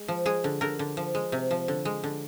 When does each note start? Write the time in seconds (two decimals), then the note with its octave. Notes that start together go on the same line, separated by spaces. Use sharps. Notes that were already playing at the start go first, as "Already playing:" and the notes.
Already playing: G#3
0.08 F3
0.25 G#3 G#4
0.44 D3
0.61 D3 A#4
0.79 D3
0.97 F3
1.15 G#3
1.32 C3
1.51 F3
1.68 D3
1.85 G#3
2.04 D3